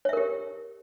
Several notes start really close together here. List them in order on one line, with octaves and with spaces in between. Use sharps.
C#5 E5 A#4 G4